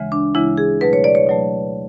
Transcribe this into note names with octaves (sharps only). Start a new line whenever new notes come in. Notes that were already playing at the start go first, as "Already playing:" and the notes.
Already playing: D2 C#3 E3 G#3
D4
D2 C#3 E3 G#3 E4
G#4
B2 F#3 A3 B4
C#5
D5
C#5
B2 F#3 A3